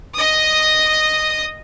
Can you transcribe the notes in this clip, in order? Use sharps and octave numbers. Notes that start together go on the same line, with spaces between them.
D#5 D#6